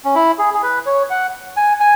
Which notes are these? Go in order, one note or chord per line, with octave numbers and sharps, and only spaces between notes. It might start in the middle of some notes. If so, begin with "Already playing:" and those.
C#4
E4
G#4
G#4
B4
C#5
F#5
G#5
G#5